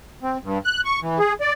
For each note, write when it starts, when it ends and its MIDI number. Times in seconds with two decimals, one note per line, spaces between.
0.23 0.38 60
0.43 0.58 43
0.65 0.81 90
0.85 1.00 85
1.02 1.19 52
1.19 1.33 68
1.41 1.53 74